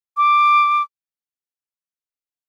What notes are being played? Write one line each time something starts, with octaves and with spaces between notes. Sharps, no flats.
D6